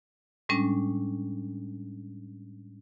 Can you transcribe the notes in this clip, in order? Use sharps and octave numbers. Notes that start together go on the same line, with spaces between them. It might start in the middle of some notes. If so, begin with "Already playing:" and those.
A2 G3 G#3 C#4 D4